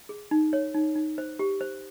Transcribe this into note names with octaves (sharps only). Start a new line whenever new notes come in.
G#4
D#4
C#5
D#4
D#4
C5
G4
C5